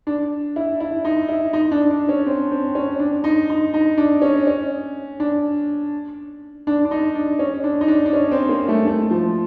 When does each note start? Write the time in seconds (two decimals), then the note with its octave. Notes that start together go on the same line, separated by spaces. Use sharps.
0.07 D4
0.56 E4
0.80 E4
1.05 D#4
1.29 E4
1.53 D#4
1.72 D4
1.91 D4
2.09 C#4
2.26 C4
2.51 C4
2.75 C#4
2.99 D4
3.24 D#4
3.49 D#4
3.74 D#4
3.98 D4
4.22 C#4
4.47 C#4
5.20 D4
6.67 D4
6.85 D4
6.91 D#4
7.15 D4
7.39 C#4
7.64 D4
7.81 D#4
7.88 D4
8.06 D4
8.13 C#4
8.32 C4
8.49 A#3
8.69 A3
8.87 A3
9.11 F3